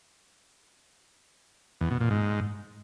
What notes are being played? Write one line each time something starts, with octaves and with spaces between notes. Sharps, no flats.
E2
B2
A#2
G#2